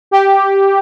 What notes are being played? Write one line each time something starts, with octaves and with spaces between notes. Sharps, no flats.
G4